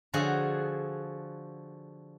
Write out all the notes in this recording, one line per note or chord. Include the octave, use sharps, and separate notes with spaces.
D3 F3 F#4 G#4